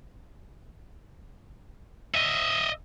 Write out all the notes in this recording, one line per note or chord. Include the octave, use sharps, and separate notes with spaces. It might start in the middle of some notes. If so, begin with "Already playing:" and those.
D#5 E5